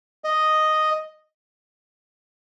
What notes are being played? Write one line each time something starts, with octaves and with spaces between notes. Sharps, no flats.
D#5